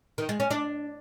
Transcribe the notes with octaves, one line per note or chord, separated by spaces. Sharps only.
D#3
G#3
C#4
D4